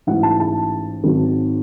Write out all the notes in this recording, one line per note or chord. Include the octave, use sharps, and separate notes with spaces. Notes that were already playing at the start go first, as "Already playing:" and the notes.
A1 G#2 F#3 F#5
A5
A5
G#1 G#2 D#3 F#3